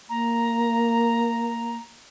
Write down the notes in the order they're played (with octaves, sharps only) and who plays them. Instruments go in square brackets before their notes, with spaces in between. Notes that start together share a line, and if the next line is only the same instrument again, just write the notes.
[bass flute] A#3 [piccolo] A#5